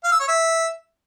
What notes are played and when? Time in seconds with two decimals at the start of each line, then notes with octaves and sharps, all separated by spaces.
0.04 F5
0.12 E6
0.20 C#5
0.28 E5